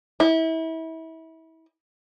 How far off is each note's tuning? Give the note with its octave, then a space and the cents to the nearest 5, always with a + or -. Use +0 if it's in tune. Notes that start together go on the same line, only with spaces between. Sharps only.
E4 -30